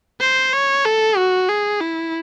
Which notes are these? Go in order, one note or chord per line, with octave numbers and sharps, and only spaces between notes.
C5
C#5
A4
F#4
G#4
E4